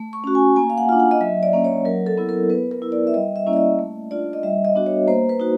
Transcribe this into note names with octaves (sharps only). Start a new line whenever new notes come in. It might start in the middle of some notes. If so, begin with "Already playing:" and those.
Already playing: A3
C#6
C#4 F#4
G#5
A#3 G#5
F5
F#5
D4 F4
F#5
D#5
F#3 E5
D5
A#3 C#4
C#5
F#3 A#4
A4
B3 E4
A#4
B3 B4
A#4
E4
D5
E5
G3 D#5
E5
A#3 C#4 E4
D5
D#5
A3
D4 F4 D5
D#5
G3 E5
D#5
B3 D4 F#4
C#5
A#3 C5
B4
D#4 F#4